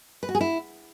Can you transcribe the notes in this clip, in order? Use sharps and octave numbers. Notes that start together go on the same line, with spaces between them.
B4
F#4
G#4
E4